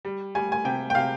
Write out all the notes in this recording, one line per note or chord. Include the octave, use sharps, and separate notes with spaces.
G3
G3 G#5
G#5
C3 G5
G5
C3 F5